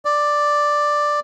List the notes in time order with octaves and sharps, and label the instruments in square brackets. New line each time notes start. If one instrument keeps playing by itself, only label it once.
[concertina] D5